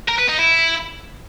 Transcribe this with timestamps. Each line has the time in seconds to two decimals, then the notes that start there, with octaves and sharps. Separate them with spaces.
0.09 A#4
0.19 B4
0.29 D#4
0.39 E4